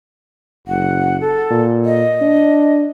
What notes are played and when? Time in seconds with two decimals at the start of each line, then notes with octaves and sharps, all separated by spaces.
0.68 F#1 F#5
1.20 A4
1.50 A#2
1.85 D#5
2.21 D4